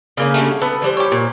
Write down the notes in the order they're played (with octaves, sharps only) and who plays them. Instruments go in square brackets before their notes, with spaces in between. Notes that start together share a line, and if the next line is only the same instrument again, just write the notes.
[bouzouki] C#3 A#3 C#4
[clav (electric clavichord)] D3 G3 A3
[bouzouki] B3 [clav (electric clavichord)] A4
[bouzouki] E3 G3 C5
[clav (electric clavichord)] G4 C#5
[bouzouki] A#2